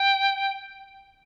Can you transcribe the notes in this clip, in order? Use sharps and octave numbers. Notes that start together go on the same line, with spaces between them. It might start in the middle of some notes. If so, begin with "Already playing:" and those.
Already playing: G5